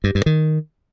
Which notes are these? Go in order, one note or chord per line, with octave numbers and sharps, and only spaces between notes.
G2
G2
D#3